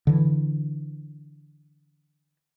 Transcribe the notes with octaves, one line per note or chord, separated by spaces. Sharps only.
D3 E3